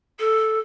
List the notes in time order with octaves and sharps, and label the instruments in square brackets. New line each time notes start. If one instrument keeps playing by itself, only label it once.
[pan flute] A4